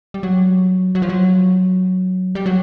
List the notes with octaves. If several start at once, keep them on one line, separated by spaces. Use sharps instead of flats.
G3
F#3
F#3
F3
F#3
G3
F#3